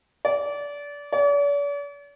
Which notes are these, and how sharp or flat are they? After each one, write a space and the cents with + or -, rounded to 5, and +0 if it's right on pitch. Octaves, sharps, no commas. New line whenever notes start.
D5 -25
D5 -45